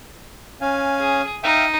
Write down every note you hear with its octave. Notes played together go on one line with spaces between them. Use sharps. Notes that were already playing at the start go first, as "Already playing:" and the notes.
C#4 F5 G#5
G#4
D#4 E5 F5 G5